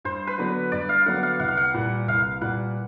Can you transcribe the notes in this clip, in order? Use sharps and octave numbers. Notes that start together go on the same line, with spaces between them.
G2 C5
B4
D3 F#3 B3 D4
G2 D5
F5
D3 F#3 B3 D4 F#5
F5
C2 F#5
F5
F#5
A#2 G3
C2 F5
A#2 G3 F#5